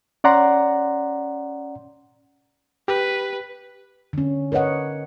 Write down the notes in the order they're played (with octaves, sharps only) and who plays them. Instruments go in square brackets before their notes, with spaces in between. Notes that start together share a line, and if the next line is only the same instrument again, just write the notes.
[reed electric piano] C#4 D5 F#5 A#5 C6
[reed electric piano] G4 [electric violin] B4
[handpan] D3 C#4
A#4 B4 C#5 D#5 F#5